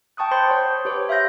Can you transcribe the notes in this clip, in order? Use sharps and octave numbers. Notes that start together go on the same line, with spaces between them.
G5 A5 C#6 D#6 F#6
C5 B5 C6 D#6 G6 A6
C#5 F#5
G4 B4 C#5
E5 F5 C6 G6 A#6